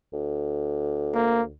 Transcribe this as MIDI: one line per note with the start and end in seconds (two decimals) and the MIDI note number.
0.13 1.55 38
1.15 1.42 58